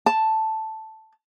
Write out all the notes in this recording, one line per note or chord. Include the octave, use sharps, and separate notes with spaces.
A5